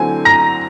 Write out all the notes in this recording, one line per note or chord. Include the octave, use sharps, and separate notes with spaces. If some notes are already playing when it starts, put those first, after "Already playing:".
Already playing: D3 F#3 A3 C4 E4 G#5
A#5 A#6